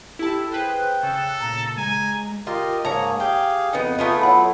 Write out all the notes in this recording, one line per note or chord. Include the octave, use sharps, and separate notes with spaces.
E4 G4 A4 A5
G#4 B4 C5 G5 F#6
C#3 A4
A#2 A#5
G#3 G#5 A#5
F4 G4 A#4 D#5
G#2 A#3 G#4 C#5 A5 A#5
G4 G#4 F5 G5
F2 B3 D#4
A3 B3 D#4 F4 G#4 B4
F#3 E4 C#5 F#5 B5